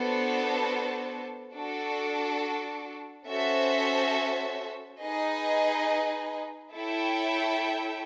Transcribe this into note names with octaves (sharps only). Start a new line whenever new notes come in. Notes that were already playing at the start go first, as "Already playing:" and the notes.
Already playing: B3 D4 F#4 A4 C5
D4 F#4 A4
C#4 F#4 A4 C5 E5
D#4 G#4 B4 D#5
E4 A4 C#5 E5 G5